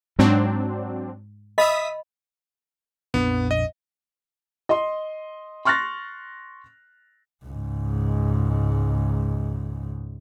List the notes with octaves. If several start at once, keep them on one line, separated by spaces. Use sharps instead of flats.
G#2 F#3 C4 D4
D#5 E5 B5 D#6 B6
A#1 F2 B3 D4
D#5
D#5 C6
C6 C#6 F6 F#6 A6 A#6
C#2 G#2